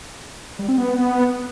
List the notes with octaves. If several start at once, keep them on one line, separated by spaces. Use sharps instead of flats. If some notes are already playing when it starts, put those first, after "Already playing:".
G3
C4
B3